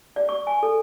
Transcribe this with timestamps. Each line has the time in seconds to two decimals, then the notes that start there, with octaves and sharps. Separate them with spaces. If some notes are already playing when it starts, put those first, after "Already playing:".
0.16 D5
0.29 C#6
0.47 G#5
0.63 A4